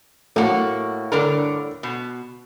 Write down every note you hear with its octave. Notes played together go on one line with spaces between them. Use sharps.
A2 A#3 F#4
G2 D3 A#4
B2